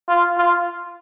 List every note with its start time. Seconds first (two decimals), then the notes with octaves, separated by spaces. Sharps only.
0.08 F4
0.38 F4